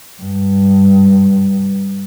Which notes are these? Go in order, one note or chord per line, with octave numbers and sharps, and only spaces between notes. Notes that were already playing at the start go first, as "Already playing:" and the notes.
G2